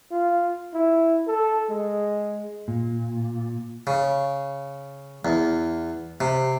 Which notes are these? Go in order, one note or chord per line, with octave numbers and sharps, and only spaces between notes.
F4
E4
A4
G#3
A#2
C#3
E2
C3